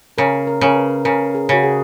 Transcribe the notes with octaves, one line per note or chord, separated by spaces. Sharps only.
C#3 A#4
A#4
C#3 A#4
B4
C#3 A#4
G#4
C#3 F#4
G#4